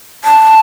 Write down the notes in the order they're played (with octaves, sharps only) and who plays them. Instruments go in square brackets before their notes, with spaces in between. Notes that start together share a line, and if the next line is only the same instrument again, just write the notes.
[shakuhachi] A5